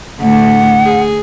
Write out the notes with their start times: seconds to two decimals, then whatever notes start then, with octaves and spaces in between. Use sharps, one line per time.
0.20 D2 A2 F#5
0.85 G#4